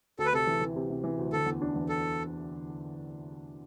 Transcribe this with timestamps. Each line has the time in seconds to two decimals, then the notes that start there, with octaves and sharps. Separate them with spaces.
0.18 D2 A4
0.26 B4
0.33 C3 A4
0.47 E3
0.61 E3
0.76 C3
0.90 C3
1.04 E3
1.19 D2
1.33 D3 A4
1.46 E2
1.62 D4
1.76 E2
1.89 A4